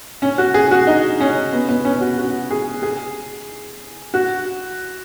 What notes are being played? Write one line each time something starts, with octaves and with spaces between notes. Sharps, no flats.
C#4
F#4
G#4
F#4
D#4
C#4
B3
B3
C#4
F#4
F#4
G#4
G#4
F#4